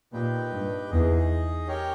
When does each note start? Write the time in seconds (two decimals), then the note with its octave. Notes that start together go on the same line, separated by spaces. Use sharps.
0.12 A#2 D#4 G4 B4 G5
0.51 G2
0.90 E2 D#4 G#4 D#5
1.68 C#4 G4 A#4 C#5 G5